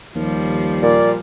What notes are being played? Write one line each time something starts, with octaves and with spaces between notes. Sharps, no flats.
D#2 F3 G3
A#2 D5